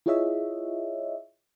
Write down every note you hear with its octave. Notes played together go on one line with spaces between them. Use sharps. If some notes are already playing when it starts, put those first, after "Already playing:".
E4 F4 G#4 C#5 D#5 E5